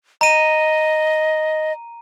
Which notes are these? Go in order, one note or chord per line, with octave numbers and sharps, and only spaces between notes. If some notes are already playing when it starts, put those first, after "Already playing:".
D#5 A#5 D#7